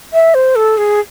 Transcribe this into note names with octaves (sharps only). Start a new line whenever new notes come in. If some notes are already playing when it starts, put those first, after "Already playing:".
E5
C5
A4
G#4